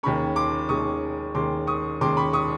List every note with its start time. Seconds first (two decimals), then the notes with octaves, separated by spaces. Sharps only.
0.03 D#2 D#3 G#3 C#4 B5 C#6
0.36 C6 D6
0.69 D#2 D#3 G#3 C#4 C#6 D#6
1.35 D#2 D#3 G#3 C#4 C6 D6
1.67 C#6 D#6
2.01 D#2 D#3 G#3 C#4 C6 D6
2.17 B5 C#6
2.33 C#6 D#6